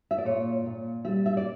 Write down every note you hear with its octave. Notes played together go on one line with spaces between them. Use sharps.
E5
D5
A#2 C#5
A#2
G3 E5
E5
D5